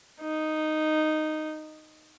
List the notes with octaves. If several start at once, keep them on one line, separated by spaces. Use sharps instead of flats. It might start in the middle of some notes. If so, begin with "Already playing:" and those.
D#4